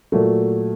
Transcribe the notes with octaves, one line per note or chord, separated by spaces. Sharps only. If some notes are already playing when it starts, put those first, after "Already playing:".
A#2 F#3 A3